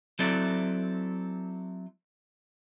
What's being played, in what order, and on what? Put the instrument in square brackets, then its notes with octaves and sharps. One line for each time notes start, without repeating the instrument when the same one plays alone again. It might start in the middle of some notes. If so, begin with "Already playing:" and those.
[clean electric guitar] F#3 C4 E4 A4 D5